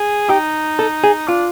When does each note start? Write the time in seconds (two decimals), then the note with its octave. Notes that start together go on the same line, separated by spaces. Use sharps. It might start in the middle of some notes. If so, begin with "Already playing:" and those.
Already playing: G#4
0.30 D#4 G4
0.79 A4
1.04 G#4
1.28 D4 F4